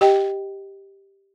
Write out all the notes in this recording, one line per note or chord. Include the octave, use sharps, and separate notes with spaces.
G4 D#5 G5